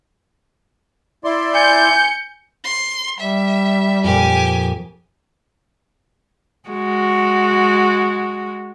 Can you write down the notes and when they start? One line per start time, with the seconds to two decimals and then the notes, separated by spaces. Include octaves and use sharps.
1.24 E4 D5 C6
1.55 G#5 G6 C#7
2.64 C6
3.20 G3 E5
4.04 F2 A#2 G4 G#5
6.70 G#3 F#4